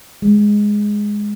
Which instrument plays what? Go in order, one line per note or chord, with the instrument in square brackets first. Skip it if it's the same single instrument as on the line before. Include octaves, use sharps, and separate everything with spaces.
[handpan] G#3